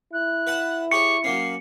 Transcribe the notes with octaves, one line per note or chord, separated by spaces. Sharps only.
E4 F#6
B4 F#5 A5
G4 G#4 C#5 C#6 C#7
F#3 A#3 C#4 C7